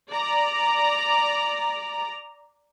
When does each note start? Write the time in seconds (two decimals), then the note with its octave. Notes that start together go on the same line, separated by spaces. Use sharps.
0.11 D5 A#5